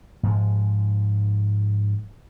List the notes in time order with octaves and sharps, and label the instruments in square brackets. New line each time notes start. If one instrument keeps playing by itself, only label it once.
[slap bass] G#2 F3 G#3